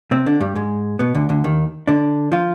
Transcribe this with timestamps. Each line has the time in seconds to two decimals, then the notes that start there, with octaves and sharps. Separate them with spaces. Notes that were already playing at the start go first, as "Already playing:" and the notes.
0.11 C3 C4
0.26 D3 D4
0.40 G2 G3
0.55 G#2 G#3
0.99 B2 B3
1.14 D2 D3
1.29 D2 D3
1.44 D#2 D#3
1.87 D3 D4
2.32 F3 F4